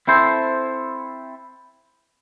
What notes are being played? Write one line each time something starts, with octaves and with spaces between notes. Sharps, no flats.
C4 E4 A4 C5